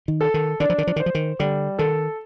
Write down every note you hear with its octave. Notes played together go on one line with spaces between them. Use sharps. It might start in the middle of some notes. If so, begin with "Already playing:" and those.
D#3
A4
D#3
D#3 D4
F3
D#3
F3
D#3 C5
F3
D#3
D3 G3
D#3 A4